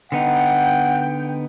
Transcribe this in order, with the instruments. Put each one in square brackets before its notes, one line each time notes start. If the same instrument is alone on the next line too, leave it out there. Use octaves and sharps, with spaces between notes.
[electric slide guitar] D3 B3 D#4 [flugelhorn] F#5 [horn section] G5